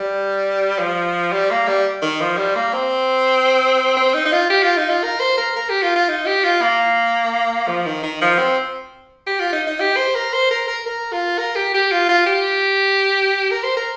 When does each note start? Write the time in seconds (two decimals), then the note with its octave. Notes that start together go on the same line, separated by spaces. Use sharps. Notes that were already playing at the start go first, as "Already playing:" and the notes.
Already playing: G3
0.79 F3
1.33 G3
1.51 A#3
1.68 G3
2.02 D#3
2.21 F3
2.38 G3
2.56 A#3
2.73 C4
3.97 C4
4.14 D#4
4.25 D#4
4.33 F4
4.50 G4
4.63 F4
4.77 D#4
4.89 F4
5.03 A#4
5.20 C5
5.38 A#4
5.56 A#4
5.69 G4
5.83 F4
5.96 F4
6.09 D#4
6.26 G4
6.44 F4
6.62 A#3
7.68 F3
7.86 D#3
8.03 D#3
8.21 F3
8.38 C4
9.27 G4
9.40 F4
9.53 D#4
9.67 D#4
9.80 G4
9.97 C5
10.15 A#4
10.33 C5
10.51 A#4
10.68 A#4
10.86 A#4
11.13 F4
11.38 A#4
11.56 G4
11.74 G4
11.92 F4
12.09 F4
12.26 G4
13.51 A#4
13.63 C5
13.77 A#4